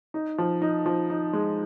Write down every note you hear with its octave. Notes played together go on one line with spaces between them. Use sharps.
D#4
F3
D#4
F3
D#4
G#3